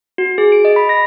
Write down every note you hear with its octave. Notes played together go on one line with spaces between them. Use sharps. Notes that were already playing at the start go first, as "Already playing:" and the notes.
F#4
G#4
D7
D#5
B5
A#6